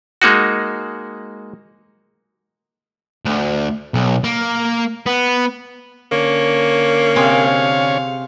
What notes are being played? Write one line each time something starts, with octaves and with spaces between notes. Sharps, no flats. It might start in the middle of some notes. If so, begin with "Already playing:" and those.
G#3 A#3 D#4 F#4
D2
B1
A#3
B3
D3 A#3 C#4 C#5
C3 C4 G#4 F5